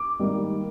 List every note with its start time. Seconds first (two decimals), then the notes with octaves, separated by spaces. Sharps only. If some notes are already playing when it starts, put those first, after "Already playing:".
Already playing: D6
0.19 G#2 D#3 G3 A#3